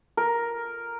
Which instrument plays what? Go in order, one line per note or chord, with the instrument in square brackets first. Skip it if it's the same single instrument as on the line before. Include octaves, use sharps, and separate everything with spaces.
[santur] A#4